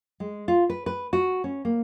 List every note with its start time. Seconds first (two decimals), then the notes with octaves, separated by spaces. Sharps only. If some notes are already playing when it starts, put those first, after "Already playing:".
0.20 G#3
0.48 F4
0.70 B4
0.86 B4
1.13 F#4
1.44 C#4
1.65 A#3